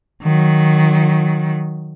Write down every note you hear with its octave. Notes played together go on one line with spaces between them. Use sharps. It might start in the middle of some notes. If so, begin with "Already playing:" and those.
D#3 F#3